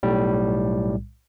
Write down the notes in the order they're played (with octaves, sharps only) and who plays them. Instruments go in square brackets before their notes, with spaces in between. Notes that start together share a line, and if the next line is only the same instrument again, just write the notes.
[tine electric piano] B1 A2 G3